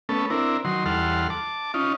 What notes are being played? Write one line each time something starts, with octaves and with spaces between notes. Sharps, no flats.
A3 B3 C#4 A4
C4 D4 E4 A#4
D#3 F#3 C6
E2 G3 A4 F#5 C6 F6
A5 D6
C#4 D#4 F4